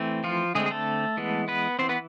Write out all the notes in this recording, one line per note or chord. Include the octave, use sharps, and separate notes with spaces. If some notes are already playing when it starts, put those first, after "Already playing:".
Already playing: E3 A3 C4
F3 F4
D3 G#3 A3 C4 G#4
G#4
A3 A4
E3 G#3 B3
B3 B4
E3 B3 C4 C5
B3 B4